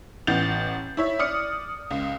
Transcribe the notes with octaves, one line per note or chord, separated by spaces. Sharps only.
A1 E3 B3 G6 A6 F7
E4 C#5 E5
D5 D#6 F6 C#7
C#2